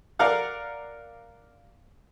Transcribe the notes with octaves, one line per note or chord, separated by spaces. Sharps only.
A#4 D5 F5 F#5